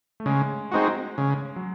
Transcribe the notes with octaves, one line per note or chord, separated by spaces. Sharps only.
A3
C#3 G#3
G#3 C4 D#4 F#4
C#3
F#3